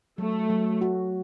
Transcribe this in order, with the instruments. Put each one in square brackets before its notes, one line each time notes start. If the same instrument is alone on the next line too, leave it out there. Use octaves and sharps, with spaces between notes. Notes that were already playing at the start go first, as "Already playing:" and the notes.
[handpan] F#3 [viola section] A3
[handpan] F#3
F#4